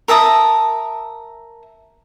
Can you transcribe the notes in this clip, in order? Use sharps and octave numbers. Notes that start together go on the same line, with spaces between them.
A#4 E5 A5 D#6